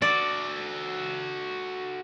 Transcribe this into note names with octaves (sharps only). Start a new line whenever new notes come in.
F#4 A4 D5